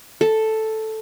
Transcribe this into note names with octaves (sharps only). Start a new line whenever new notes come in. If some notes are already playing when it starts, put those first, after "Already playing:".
A4